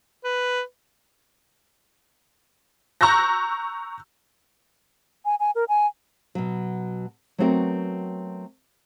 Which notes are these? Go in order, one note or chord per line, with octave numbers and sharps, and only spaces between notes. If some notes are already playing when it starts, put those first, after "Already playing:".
B4
A#5 C#6 E6 F#6 G6 A#6
G#5
G#5
A#4
G#5
B2 F#3
F#3 A3 B3 C4 F#4 A#4